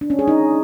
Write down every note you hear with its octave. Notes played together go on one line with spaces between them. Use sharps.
D4
C#4
G#4
D#4